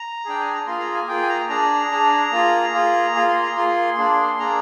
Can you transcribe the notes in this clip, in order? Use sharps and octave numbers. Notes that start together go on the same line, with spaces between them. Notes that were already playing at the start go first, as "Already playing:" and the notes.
Already playing: A#5
D4 G#4 G5
G#5
A#5
A#3 F4 G#4 C6
A#5
G#5
A#3 F4 G#4 G5
G#5
A#5
D4 G#4 A#5
D4 G#4
A#3 F4 G#4
A#3 F4 G#4
A#3 F4 G#4
C6
A#5
A#3 F4 G#4 C6
A#3 D4 G#4
A#3 D4 G#4 A#5